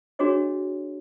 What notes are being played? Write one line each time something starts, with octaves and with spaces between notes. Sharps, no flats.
D4 F#4 G#4 C#5 D#5